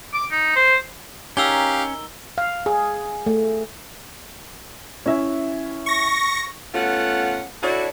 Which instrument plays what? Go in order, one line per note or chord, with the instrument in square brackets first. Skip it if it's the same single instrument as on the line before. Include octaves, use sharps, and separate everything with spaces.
[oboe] D6
D#4
C5
[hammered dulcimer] D#3 A#5 [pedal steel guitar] C#4 [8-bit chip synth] G4 F5 [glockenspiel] E6 G7
[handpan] F5
G#4
A3
[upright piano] C#4 E4 E5
[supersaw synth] C#6 A#6
[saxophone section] A3 B3 C#4 F4 F#5
D4 E4 F#4 A4 C#5 D5